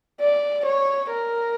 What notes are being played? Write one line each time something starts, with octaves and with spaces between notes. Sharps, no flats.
D5
C#5
A#4